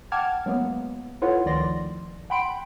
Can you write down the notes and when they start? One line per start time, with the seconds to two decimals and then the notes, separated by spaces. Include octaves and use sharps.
0.12 F#5 G5 A5 D6 F6 G#6
0.46 F#3 G#3 A#3 B3
1.22 E4 F4 A4 B4 C#5 F#5
1.46 D2 D#3 F3 D5 C6 A#6
2.30 F#5 G5 B5 C6 D7